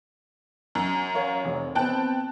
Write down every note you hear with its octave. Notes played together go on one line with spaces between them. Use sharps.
F#2
A#4 C#5 F5
F1
B3 C4 G5 A5 F#6